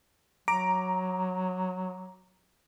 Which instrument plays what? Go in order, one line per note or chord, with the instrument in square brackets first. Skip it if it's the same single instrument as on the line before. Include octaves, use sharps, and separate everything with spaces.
[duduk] F#3 [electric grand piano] A#5 D6 D7